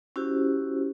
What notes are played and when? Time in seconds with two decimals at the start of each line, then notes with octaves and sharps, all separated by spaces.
0.16 C#4 E4 F#4 G4 C5